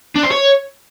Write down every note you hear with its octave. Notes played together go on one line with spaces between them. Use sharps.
D4
C5
C#5